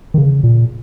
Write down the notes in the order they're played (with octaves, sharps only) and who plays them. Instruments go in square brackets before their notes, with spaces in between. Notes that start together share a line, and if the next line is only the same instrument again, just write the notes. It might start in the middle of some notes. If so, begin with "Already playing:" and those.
[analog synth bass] D#3
C#3
A#2